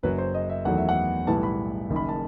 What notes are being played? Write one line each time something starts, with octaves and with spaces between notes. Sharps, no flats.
F#1 F#2 F#3 B4
C5
D#5
E5
E2 D#3 F#3 A3 F#5
E5
F#5
B1 A2 E3 G3 B3 A5
B5
F#1 F#2 D#3
B5
A5